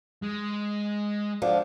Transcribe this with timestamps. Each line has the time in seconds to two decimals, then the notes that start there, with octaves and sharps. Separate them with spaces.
0.22 G#3
1.42 D3 F3